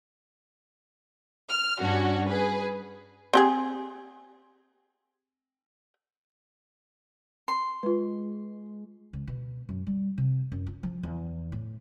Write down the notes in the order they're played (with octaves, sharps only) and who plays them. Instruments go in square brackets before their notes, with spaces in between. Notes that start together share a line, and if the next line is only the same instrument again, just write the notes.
[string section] F6
G2 C#4 D4 F#4
G#4 B4
[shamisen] C4 G4 G#4
[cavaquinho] C6
[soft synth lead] G#3 [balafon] F4 B4
[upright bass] C#2
B2
F#2
G3
C3
F#2
F4
F3
E2
A2